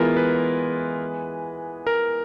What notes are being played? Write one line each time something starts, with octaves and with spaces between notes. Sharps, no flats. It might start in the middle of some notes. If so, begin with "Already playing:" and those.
Already playing: E3 G#3 B3 E4 F4 A#4
B4
A#4